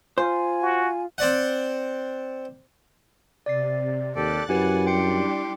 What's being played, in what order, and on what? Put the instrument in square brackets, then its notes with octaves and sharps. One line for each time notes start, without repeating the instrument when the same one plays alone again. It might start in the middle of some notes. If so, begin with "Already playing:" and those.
[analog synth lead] F4 [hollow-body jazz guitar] C5 [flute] G#5
[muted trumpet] F#4
[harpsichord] C4 D5 F#5
[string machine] C3 [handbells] D5 A6 C7
[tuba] D#2 [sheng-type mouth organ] G4 A4 D5 [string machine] F#6 A6
[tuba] F#2 [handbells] E4 G4 B4 [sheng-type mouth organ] F#5 G#5
[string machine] G3 D4 G4 [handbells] E4 G5 C#7 [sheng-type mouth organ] C6 D6